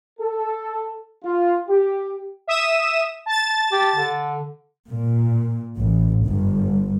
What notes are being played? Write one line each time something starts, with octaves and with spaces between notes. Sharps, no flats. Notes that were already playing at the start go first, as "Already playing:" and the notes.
A4
F4
G4
E5 D#6 E7
A5 A6
G4
D3
A#2
A1
G1